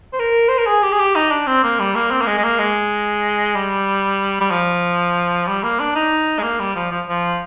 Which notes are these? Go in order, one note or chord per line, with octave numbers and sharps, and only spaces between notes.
C5
A#4
C5
A#4
G#4
G4
G#4
G4
D#4
D4
C4
A#3
G3
A#3
C4
A#3
G#3
G#3
A#3
G#3
G3
G3
F3
G3
A#3
D4
D#4
G#3
A#3
G3
F3
F3
F3